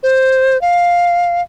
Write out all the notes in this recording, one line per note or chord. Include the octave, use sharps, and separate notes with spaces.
C5
F5